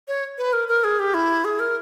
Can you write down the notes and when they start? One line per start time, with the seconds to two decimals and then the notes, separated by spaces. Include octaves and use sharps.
0.08 C#5
0.38 B4
0.53 A#4
0.68 A#4
0.84 G#4
0.99 G4
1.14 E4
1.45 G#4
1.60 A#4